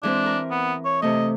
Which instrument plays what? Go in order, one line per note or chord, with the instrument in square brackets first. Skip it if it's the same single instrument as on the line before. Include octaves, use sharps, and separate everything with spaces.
[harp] E3 G#3 C4 [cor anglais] D4
[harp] A#4
[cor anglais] B3
C#5
[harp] C3 A3 [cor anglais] D#5